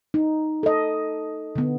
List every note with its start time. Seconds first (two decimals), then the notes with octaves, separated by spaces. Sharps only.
0.14 D#4
0.63 A4 D#5
1.56 D3 B3